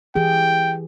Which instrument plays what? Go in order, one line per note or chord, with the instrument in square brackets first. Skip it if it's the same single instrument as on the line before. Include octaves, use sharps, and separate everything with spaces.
[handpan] E3 G4 G#4 [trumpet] G5